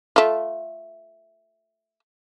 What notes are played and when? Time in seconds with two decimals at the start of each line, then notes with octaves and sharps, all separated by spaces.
0.16 A3 F4